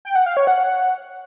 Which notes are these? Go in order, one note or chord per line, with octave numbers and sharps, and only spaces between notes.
G5
F#5
F5
C#5
F#5